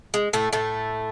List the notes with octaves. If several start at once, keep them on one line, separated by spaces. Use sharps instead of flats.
G#3
A2 A3
A2 A3